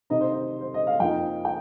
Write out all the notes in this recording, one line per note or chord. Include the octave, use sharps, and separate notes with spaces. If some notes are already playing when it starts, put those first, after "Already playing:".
C3 D#3 C4 D#4 D#5
C5
D#5
C5
D#5
F5
F2 F3 A#3 D#4 G5
G5